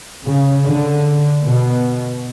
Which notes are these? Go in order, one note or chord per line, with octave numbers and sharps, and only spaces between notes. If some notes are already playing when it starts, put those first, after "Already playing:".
C#3
D3
B2